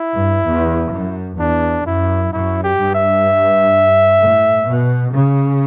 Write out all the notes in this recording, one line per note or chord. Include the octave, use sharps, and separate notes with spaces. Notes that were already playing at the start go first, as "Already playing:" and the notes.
Already playing: E4
G2
E2
F#2
E2 D4
F#2 E4
F#2 E4
G4
G2
E5
A2
B2
C#3